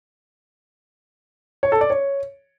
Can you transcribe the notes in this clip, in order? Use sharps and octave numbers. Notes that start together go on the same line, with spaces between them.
C#5
A4
D5
C#5